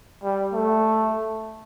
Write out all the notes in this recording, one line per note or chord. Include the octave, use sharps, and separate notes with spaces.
G3
A3